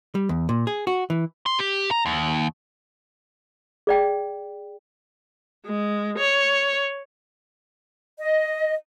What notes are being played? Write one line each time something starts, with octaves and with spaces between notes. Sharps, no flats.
G3
E2
A#2
G#4
F#4
E3
C6
G4
A#5
D#2
G#4 D5 G5
G#3
C#5
D#5